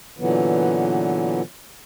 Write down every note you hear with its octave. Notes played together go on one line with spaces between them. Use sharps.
A#2 D3 E3 F#3 B3